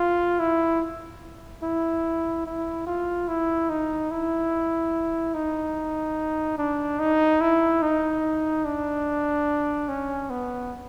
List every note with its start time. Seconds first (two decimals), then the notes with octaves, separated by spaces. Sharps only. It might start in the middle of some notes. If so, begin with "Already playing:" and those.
Already playing: F4
0.39 E4
1.63 E4
2.46 E4
2.87 F4
3.28 E4
3.69 D#4
4.11 E4
5.34 D#4
6.58 D4
6.99 D#4
7.41 E4
7.82 D#4
8.65 D4
9.89 C#4
10.30 B3